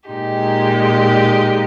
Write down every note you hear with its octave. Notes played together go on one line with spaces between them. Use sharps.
A#2 G#3 D#4 G4